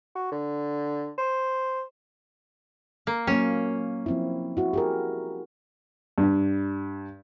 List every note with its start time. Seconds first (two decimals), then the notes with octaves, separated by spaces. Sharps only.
0.15 F#4
0.32 D3
1.18 C5
3.07 A#3
3.27 F#3 A#3 C#4
4.06 F3 C4 E4
4.57 E4 F#4
4.73 G4 G#4 A#4
6.18 G2